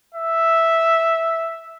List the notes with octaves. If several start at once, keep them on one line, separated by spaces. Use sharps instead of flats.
E5